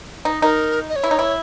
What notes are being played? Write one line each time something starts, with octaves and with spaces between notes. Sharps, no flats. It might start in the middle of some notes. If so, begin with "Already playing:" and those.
D#4
D#4 A#4
D#5
C#5
E4
D#4
E4